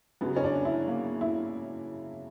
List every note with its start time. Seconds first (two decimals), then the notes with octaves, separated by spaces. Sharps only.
0.21 F#2 C#3 F#3 B3
0.36 C#4
0.44 D4
0.65 E4
0.88 A#3
1.21 E4